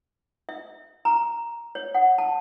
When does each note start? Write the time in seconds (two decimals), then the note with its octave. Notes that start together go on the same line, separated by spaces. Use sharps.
0.49 E5
1.05 A#5
1.75 C#5
1.95 F#5
2.18 A5